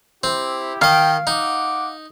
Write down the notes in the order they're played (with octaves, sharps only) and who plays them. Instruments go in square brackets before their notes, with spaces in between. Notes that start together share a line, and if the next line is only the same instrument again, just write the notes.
[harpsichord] C4 [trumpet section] E4 G4
[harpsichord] D#3 D#5 [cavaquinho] F5 [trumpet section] G5
[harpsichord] D#4 [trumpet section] F#5 D6